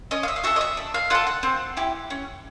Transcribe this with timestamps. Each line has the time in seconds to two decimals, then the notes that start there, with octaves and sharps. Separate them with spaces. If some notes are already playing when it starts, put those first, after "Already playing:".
0.11 C#4 D#5
0.23 F5
0.28 E5
0.36 F5
0.44 F#4 A4 E5
0.56 D#5
0.61 E5
0.77 D4
0.94 F5
1.10 F4 A4 F#5
1.27 F#5
1.43 C4
1.77 E4 G4
2.10 C#4